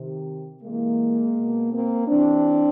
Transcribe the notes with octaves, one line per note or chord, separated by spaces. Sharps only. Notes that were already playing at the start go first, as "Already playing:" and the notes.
Already playing: C3 D#3
C3 E3 G#3 A#3
B2
A#3 C4
C3 E3 C4 D4